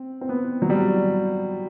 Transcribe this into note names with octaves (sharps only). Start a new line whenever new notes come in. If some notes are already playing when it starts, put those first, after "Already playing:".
Already playing: C4
C4
B3
F#3
G3